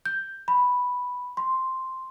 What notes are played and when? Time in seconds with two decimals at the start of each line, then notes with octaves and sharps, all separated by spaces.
0.06 G6
0.48 B5
1.37 C6